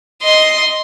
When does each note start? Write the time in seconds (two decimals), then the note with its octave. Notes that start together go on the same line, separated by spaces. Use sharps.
0.23 D#5 C6